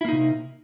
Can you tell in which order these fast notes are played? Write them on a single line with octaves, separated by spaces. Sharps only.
E4 A#3 D#4 C3